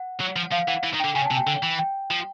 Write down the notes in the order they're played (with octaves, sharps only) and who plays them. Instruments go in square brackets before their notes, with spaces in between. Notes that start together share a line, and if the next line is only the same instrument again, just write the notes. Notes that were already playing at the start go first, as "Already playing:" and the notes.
Already playing: [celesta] F#5
[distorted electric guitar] F#3
F3
[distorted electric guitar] F3 [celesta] F5
[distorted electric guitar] E3 [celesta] F#5
[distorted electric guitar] E3
D#3
[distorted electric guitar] D3 [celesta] G5
[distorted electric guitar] C#3 [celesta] G#5
[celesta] A5
[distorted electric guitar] C3
[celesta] G5
[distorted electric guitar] D3 [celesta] G5
[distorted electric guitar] E3
[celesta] G5
[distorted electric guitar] F3